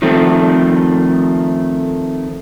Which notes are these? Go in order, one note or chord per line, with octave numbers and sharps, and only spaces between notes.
D#3 F3 A3 C4